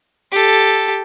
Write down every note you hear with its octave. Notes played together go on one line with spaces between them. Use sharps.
G4 A4